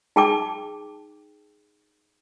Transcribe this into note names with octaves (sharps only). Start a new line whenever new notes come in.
D#4 G#4 G5 A5 D6